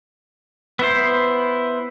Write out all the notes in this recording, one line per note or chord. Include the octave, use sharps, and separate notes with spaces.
B3 E4 C5